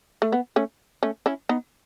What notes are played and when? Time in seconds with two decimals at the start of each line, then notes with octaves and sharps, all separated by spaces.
0.22 A3
0.32 B3
0.56 A3 C#4
1.03 A3 C#4
1.26 C#4 E4
1.49 B3 D#4